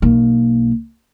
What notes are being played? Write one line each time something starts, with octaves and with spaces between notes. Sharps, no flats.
B1 A#3